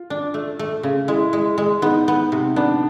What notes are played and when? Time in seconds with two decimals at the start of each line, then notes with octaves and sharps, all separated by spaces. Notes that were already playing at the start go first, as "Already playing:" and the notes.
Already playing: F4
0.10 D4
0.34 A3
0.59 A3
0.83 C#3
1.08 G#3 E4
1.33 G#3
1.58 G#3
1.82 B3 D#4
2.08 B3
2.32 C3
2.56 B3 D4